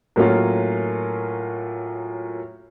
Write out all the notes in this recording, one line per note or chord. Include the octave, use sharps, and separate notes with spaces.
A2 F#3 A#3 C#4 F4